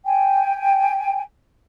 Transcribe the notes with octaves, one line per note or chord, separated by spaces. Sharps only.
G5 G#5